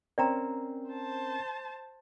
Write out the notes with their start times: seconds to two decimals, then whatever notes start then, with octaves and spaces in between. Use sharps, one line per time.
0.18 C4 C#4 A#4 D5 G5 A#5
0.90 C5 A5